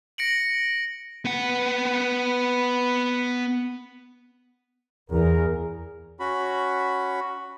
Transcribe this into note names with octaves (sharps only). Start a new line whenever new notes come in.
A#6 C#7 D7 F#7
B3 F#5
E2 G#4 A#4
C#4 F#4 B5